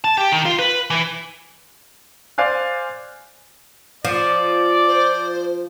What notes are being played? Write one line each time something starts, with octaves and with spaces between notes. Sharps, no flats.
A5
G4
D#3
F4
B4
E3
C5 D5 F5 G#5 F#6
F3 D5
C5